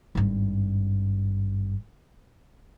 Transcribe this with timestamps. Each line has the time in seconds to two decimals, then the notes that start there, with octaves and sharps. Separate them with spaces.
0.15 G#1 G2